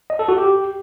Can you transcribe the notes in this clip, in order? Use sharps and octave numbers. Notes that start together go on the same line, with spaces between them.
D#5
A4
F#4
G4